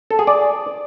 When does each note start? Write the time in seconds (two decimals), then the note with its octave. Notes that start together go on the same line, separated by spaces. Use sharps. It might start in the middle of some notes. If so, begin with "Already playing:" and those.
0.11 A4
0.19 G#4
0.27 D5